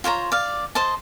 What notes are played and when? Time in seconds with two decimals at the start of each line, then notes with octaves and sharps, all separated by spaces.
0.04 F4 C5 C#5 A#5
0.32 D5 F5
0.75 C5 D#5 A5